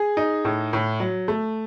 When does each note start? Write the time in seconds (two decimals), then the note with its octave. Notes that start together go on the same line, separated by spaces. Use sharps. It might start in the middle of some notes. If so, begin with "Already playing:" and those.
Already playing: G#4
0.17 D#4
0.45 A2
0.73 A2
1.00 F#3
1.28 A3